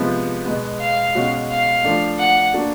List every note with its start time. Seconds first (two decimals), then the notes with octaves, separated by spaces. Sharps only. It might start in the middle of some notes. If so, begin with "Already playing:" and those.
Already playing: C3 F3 G#3 B3
0.45 B2 G#3 B3
0.80 F5
1.15 B2 G#3 C#4 F#4
1.50 F5
1.84 F3 A3 D4
2.19 F#5
2.54 A#3 D4 F#4 A4